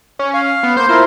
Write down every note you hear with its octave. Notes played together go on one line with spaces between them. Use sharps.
C#4
F5
B3
A#3 C5 G6
E4 F4 A#4 C5